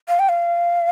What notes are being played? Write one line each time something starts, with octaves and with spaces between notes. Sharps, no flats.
F5
G5
F5